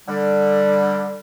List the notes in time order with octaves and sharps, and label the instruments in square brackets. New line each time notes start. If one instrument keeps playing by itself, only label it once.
[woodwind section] D3 G3